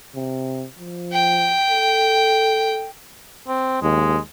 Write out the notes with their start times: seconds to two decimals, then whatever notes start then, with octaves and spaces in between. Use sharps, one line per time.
0.16 C3
0.79 F3
1.13 G5
1.70 A4
3.48 C4
3.82 D#2 G#3